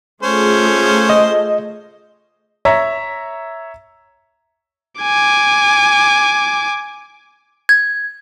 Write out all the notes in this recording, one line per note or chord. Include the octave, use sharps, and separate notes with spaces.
A3 C#4 F4 G#4 C5
D#5
C#5 E5 A#5
G#5 D6
G#6